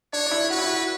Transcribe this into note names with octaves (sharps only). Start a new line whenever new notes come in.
D4 C#5
D4
E4
F#4 B4
E4
F#4